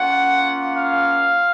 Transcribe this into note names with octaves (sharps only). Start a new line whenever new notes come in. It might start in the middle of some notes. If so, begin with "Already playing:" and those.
Already playing: A#3 C#4 F4 F#5
F5